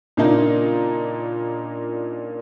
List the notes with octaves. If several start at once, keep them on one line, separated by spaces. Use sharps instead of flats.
A#2 C#3 A#3 D4 D#4